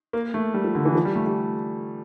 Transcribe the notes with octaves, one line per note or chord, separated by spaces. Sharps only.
A#3
A3
G3
F3
D3
E3
F3
G3
A3
G3